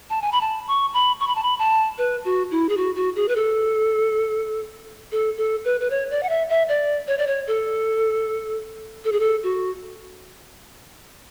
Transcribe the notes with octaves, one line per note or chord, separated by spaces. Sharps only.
A5
G#5
B5
A5
C#6
B5
C#6
B5
A5
B5
A5
B4
F#4
E4
G#4
F#4
F#4
G#4
B4
A4
A4
A4
B4
B4
C#5
D5
F#5
E5
E5
D5
C#5
D5
C#5
A4
A4
G#4
A4
F#4